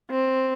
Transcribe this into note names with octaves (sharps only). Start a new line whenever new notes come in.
C4